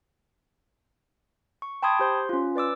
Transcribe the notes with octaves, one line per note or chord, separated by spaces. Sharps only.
C#6
G5 A5 B5 C6 D#6 G#6
G4 C5 C6
C#4 F4
B4 D5 D6 E6